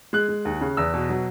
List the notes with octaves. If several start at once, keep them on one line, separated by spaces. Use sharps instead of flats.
G#3 F#6
G#3
D#2
C#3
E2 E6
B2
F#3